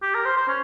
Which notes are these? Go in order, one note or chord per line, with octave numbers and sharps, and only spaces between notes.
G4
A#4
C5
C5
C#4